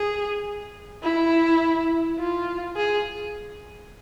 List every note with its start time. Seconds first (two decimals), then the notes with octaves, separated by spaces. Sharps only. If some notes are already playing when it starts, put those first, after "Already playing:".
Already playing: G#4
1.02 E4
2.19 F4
2.77 G#4